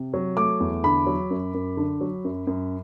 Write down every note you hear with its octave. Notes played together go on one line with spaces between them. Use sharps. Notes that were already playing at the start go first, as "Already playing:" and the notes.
Already playing: C3
F#3
A3 D6
E2
D3 B5
F#3
F#2
F#2
D3
F#3
F#2
F#2